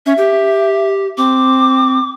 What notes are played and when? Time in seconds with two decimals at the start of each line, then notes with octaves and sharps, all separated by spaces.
0.06 C#4 E5
0.18 G4
1.18 C4 D6